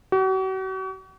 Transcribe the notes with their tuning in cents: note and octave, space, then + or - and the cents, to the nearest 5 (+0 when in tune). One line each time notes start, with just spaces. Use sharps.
F#4 +40